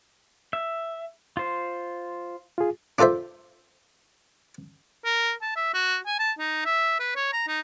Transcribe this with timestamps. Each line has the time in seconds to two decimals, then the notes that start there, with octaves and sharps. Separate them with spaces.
0.53 E5
1.37 F4 C5
2.58 F4 G#4
2.99 D4 F4 A4 C5 E5
5.05 A#4
5.42 A5
5.56 E5
5.74 F#4
6.06 G#5
6.19 A5
6.39 D#4
6.65 E5
7.00 B4
7.16 C#5
7.33 A#5
7.48 D#4